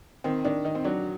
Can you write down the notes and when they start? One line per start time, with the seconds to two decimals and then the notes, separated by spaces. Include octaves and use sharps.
0.24 D#3 C4
0.45 D#3 D4
0.64 D#3 D#4
0.75 C4
0.84 F#3 D4